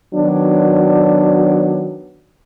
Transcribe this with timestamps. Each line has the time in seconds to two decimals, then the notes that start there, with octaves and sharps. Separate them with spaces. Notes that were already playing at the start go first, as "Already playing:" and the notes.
0.14 D#3 F#3 B3 D4